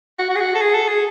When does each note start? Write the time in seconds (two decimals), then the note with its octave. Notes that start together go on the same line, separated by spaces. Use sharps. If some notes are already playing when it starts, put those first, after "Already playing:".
0.19 F#4
0.30 F#4
0.36 G#4
0.40 F#4
0.55 A4
0.62 G#4
0.75 A4
0.88 G#4